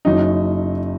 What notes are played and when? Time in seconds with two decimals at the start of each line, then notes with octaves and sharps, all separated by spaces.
0.05 F#1 F#2 F#3 D#4